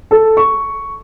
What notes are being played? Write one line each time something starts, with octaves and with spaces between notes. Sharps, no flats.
A4
C#6